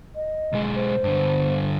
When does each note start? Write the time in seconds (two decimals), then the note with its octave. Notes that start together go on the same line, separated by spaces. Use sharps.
0.16 D#5
0.53 B1 G#3
0.75 C5
1.04 G2 D3